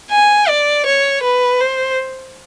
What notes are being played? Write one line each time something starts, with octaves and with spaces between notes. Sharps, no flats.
G#5
D5
C#5
B4
C5